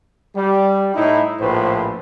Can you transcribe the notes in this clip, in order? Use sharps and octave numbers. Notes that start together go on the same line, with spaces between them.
G3
A2 D#4 E4
A#1 A2 B4 C5